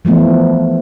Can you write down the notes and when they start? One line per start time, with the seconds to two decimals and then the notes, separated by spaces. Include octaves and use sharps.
0.05 E3 F3 A3 B3